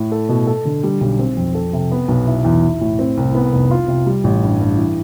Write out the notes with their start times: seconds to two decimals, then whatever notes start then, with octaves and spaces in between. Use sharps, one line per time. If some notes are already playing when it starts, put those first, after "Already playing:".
Already playing: A2
0.12 A4
0.29 B2
0.47 A4
0.65 D3
0.83 G3
1.01 B1
1.19 C4
1.37 F2
1.55 A4
1.73 C3
1.92 B3
2.08 B1
2.27 E4
2.45 E2
2.63 E4
2.81 A2
2.99 C4
3.17 C2
3.35 B3
3.53 F1
3.71 F4
3.88 C3
4.06 G3
4.24 A1
4.43 G2
4.60 G2
4.78 E3